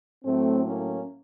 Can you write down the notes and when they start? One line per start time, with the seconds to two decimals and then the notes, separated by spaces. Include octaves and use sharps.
0.24 A2 F#3 A3 C4
0.65 A#3 C#4